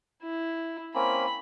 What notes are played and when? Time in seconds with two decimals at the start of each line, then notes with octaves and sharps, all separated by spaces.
0.23 E4
0.95 A#3 C4 C#4 B5